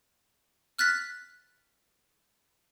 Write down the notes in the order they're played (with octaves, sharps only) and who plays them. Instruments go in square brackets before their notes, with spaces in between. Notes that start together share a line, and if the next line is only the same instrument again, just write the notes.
[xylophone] F6 F#6 A6 B6